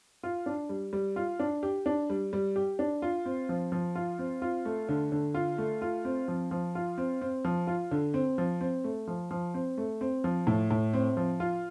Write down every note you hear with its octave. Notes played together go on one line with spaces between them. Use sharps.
F4
D4
G3
G3
F4
D4
G4
D4
G3
G3
G4
D4
F4
C4
F3
F3
F4
C4
F4
A3
D3
D3
F4
A3
F4
C4
F3
F3
F4
C4
C4
F3
F4
D3
C4
F3
C4
A3
F3
F3
C4
A3
C4
F3
A2
A2
C4
F3
F4